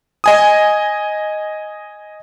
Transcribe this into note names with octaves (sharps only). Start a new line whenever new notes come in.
D#5 G#5 D#6